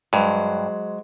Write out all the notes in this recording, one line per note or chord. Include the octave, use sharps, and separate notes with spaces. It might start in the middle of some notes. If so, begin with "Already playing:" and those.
G2 F#3 G#3 C5